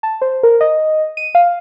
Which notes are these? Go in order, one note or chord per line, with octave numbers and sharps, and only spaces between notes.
A5
C5
A#4
D#5
D#7
F5